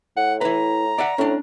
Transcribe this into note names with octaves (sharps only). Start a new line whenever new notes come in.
A2 F#5
E4 B4 A#5
D5 E5 F#5
A2 C#4 D4